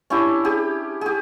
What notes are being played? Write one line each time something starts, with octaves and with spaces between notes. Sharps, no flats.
C#4 D4 E4 G4
G4 G#4
G4 G#4